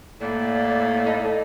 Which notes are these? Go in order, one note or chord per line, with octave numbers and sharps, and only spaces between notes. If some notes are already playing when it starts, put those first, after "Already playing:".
A2 A#3 D5
D#4 A4